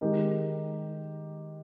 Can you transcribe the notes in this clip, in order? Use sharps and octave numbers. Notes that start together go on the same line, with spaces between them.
D#3 G#3 D#4 G4 A#4